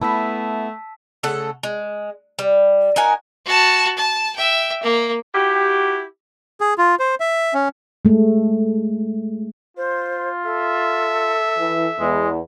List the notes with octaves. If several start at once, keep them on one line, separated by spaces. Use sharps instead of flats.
A3 B3 E4 A5 E6 B6
C#3 A3 A4 F#5
G#3
G3
D#4 F#4 A#4 G#5
F#4 A5
A5
E5 G5
A#3
E4 F#4 G4
G#4
F4
C5
E5
C#4
G#3 A3
F4 C5
A4 E5
E3
E2 G#3